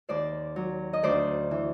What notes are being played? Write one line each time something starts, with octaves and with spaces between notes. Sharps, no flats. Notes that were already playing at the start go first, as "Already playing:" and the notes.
D#2 C5 D5
F#3
D#5
D2 C5 D5
E3